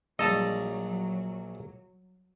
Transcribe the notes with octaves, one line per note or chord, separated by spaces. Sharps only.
A#1 F#3 G3 D#5 A5 A#5